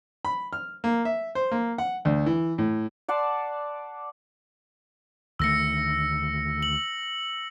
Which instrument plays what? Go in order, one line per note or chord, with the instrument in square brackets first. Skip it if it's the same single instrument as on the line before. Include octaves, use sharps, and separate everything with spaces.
[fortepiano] B5
F6
A#3
E5
C5
A#3
F#5
D2
E3
A2
[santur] D5 F#5 A5 C6
[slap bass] D2 D#3 A3 [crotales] E6 A#6 C#7
[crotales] F#7